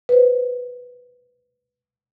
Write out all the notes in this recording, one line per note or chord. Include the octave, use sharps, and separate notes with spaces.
B4 C5